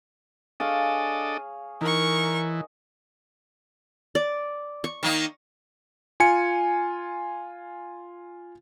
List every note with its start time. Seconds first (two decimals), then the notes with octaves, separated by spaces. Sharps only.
0.60 D4 G#4 A4 C#5 D#5 F5
1.81 E3 D#4 A#4 C#6
4.15 D5
4.84 C#6
5.03 D#3 A#3 D#4
6.20 F4 G#5 C#7